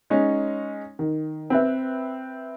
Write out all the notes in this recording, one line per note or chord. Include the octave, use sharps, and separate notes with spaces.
G#3 C#4 D#4 C#5
D#3
C4 B4 E5